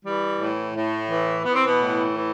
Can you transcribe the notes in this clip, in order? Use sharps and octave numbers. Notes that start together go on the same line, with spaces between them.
E3 G3
A2
A2
E3
E3 B3
C4
B2 B3
A2
E3